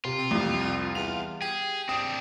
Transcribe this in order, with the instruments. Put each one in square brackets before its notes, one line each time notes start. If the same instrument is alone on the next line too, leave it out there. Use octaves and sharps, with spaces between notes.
[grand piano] C3 [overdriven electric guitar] F4
[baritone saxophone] C4
[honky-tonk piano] C2 F2 [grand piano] G3
[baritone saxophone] E2 [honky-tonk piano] F7
[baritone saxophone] G4 [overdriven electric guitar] G#4
[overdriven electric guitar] C4 D4 [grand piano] G5 [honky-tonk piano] D#6